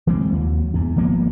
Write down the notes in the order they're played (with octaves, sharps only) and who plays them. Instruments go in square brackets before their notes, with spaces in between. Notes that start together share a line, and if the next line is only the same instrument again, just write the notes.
[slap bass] E3 G#3 C4
D#2 F#3
E2 G#2
G#1 F3 A#3 B3